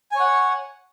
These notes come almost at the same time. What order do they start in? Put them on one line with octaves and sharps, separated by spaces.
G#5 C#5 F#5